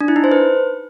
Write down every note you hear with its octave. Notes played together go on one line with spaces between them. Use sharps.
D4
E4
D#4
C5
B4